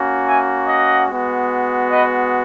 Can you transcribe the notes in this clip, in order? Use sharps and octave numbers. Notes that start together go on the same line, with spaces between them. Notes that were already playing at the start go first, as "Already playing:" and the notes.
Already playing: A#3 C#4 F#4
E5 G#5
D#5 F#5
G#3 B3 F#4
B4 D#5